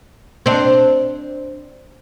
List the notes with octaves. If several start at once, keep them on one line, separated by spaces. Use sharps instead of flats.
C4 D4